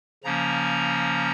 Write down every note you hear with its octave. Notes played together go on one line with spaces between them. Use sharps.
C#3 F3 A#3 C#4 A#5